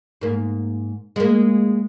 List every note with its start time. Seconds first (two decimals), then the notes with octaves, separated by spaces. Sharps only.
0.21 G#2 A#3
1.16 G#3 A#3